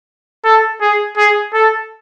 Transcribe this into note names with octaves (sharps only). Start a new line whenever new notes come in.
A4
G#4
G#4
A4